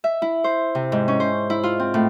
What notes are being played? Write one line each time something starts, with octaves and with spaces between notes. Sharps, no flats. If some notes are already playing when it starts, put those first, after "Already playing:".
E5
E4
C5
C3
G#2
C#4
C5
E4
F4
C4
A2